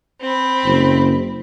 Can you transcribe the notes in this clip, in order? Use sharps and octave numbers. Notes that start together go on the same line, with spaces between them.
C4 B5
F#1